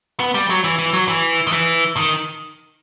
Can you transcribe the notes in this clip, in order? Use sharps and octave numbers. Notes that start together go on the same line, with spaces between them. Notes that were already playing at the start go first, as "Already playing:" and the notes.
B3
G3
F#3
E3
E3
F#3
E3
D#3
E3
D#3